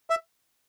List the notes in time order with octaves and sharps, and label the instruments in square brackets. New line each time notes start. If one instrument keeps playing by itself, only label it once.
[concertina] E5